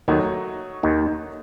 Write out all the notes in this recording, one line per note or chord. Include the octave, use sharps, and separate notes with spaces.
D#2 D#3 F#3 A3 D#4 F#4 C#5
D#2 D#3